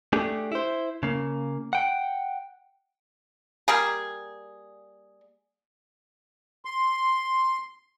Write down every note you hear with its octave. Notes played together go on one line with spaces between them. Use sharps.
A3 D4 G4 G#4
E4 C5
C#3 A#3
F#5 G5
G3 A#3 G#4
C6